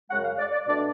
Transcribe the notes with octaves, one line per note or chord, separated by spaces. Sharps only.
F#2 C#3 G#3 F#5
F5
D5
D5
B2 A3 D4 D5